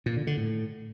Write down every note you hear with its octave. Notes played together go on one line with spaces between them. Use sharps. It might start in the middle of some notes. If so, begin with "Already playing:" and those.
A#2
D3
D3
A2